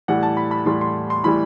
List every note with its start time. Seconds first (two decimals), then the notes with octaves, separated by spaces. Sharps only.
0.08 A2 E3 G3 F#5
0.23 A5
0.37 B5
0.51 B5
0.66 A2 E3 G3 C6
0.81 C6
1.10 C6
1.24 A2 E3 G3 B5